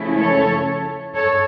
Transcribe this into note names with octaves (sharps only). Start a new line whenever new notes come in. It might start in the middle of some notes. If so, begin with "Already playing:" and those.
Already playing: C#3 F3 A3 C#4 E4
A4 C#5
A4 C#5